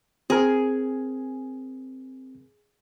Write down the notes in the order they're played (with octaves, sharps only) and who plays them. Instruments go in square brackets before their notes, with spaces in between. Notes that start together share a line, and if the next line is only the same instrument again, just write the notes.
[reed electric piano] C4 A#4 [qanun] G#4